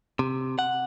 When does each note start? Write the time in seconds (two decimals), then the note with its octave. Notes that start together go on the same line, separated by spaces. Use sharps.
0.19 C3
0.59 F#5